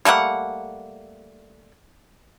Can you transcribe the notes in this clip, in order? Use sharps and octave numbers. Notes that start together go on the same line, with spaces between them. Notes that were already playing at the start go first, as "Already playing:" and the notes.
G3 A3 A#3 F#5